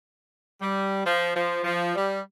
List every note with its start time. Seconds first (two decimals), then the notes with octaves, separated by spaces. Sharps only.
0.61 G3
1.05 F3
1.35 F3
1.64 F3
1.95 G3